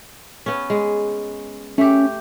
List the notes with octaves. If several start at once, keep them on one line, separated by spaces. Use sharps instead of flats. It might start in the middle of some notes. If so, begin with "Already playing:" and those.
B3 C#4
G#3
A3 C#4 G4